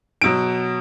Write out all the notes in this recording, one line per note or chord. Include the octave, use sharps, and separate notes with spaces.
B2 F#3 D7